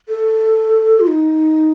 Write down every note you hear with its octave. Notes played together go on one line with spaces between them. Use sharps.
A4
F4
D#4